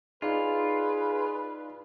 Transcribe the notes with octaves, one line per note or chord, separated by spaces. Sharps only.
D#4 F4 G#4 B4 D5 F5